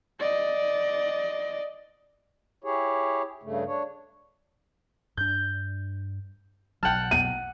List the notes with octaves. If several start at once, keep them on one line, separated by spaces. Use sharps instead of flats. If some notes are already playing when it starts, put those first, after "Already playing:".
D5 D#5
E4 G4 G#4 C#5
G2 C#3 A3
D4 C#5
G2 D4 G6
B1 B2 F#3 F#5 G5 A5 F6
D#7